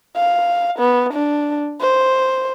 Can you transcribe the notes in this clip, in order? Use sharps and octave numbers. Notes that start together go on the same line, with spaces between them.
F5
B3
D4
C5